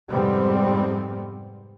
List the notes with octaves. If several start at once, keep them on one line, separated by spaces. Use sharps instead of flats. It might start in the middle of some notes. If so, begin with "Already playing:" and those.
F2 G#2 C3 G3 B3 C4